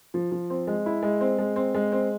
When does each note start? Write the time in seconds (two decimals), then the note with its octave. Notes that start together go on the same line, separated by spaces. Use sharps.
0.14 F3
0.32 F3
0.50 C4
0.67 G#3
0.86 E4
1.03 G#3
1.21 C4
1.38 G#3
1.56 C4
1.75 G#3
1.92 C4